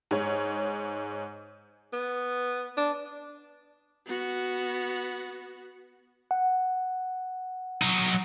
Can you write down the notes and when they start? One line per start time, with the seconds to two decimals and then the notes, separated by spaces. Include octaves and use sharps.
0.11 G#2 C#5
1.93 B3
2.77 D4
4.06 B3 F#4
6.31 F#5
7.82 F#3 D#4